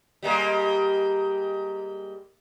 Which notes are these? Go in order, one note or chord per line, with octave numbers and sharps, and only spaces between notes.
G3 G#3 A#3